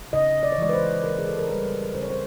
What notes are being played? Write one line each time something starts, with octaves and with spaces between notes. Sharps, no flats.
C#3 D#5
D5
C#5
E3 G#3 D5
B4
C5
C#3 A#4
G#4
A4
A#4
E3 G3 B4
C#3 C5
C#5
C5